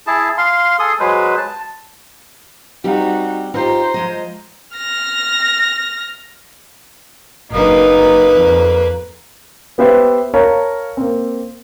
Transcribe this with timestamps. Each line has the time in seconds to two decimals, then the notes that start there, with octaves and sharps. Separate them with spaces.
0.07 E4 G#4 A5
0.38 F5 C6
0.79 G#4 A4 C6 D#6
0.99 F#3 G#3 B4 C5
1.37 A5
2.84 G3 C4 D#4 F#4 G4
3.54 D#4 F4 G4 C5 A#5
3.94 F3 G#3 D#5
4.77 F6 A#6
7.51 F#1 A#3 D#4 B4
8.35 F2
9.78 B3 G4 B4 C5 E5
10.34 A#4 C#5 F5 A5 A#5
10.97 A#3 C4